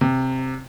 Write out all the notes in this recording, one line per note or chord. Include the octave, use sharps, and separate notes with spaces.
C3